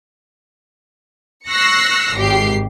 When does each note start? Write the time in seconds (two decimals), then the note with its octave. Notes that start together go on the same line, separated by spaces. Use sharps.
1.49 C#6 E6 F#6 A#6 C7 C#7
2.15 G#1 G#2 G4 C7